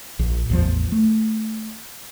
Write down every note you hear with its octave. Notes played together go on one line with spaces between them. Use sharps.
A#1
A1 E2 F3
A3